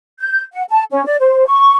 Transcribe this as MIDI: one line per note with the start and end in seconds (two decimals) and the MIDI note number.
0.20 0.41 91
0.52 0.63 78
0.70 0.83 81
0.91 1.04 61
1.06 1.17 74
1.20 1.47 72
1.47 1.77 85